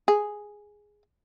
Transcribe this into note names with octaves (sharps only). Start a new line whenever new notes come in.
G#4